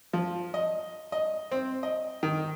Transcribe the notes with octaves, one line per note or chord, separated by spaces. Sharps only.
F3
D#5
D#5
C4
D#5
D#3